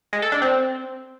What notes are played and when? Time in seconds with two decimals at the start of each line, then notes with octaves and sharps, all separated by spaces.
0.13 G#3
0.22 A4
0.32 D4
0.42 C4